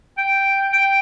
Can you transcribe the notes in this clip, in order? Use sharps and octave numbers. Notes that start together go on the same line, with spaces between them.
G5
G5